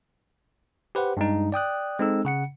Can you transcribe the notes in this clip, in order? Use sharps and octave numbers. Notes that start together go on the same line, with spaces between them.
G4 B4 C5 F#5
G2 G#3 D#4
D5 G5 D#6 F#6
G#3 C4 D#4 A4 E6
C#3 F#5 C#7